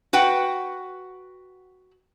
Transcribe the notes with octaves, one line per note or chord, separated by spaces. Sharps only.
F#4 B4 F#5 G5